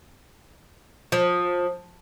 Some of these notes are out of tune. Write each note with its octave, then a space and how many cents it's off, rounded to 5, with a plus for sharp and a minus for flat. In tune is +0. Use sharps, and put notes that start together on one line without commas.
F3 +20